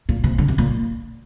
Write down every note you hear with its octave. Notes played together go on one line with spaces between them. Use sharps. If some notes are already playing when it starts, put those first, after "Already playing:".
A#2
C3
D3
C3
A#2